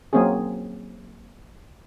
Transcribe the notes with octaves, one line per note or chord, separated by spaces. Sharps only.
F#3 A#3 C4 C#4 G#4